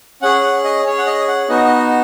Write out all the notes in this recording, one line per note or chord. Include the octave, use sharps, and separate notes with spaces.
C#4 G#4 F#5
F#5
D#5
C#4 G#4 C#5
F#5
D#5
F#5
B3 D#4 F#4 D#5
D#5